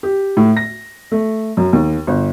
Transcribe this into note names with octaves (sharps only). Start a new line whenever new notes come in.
G4
A2
A#6
A3
F#2
D#2
G1